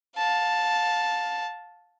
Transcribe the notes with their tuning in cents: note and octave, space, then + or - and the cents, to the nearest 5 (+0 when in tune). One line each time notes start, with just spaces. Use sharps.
F5 +25 A5 +0